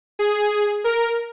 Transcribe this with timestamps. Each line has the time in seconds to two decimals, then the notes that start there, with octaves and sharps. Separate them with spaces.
0.19 G#4
0.84 A#4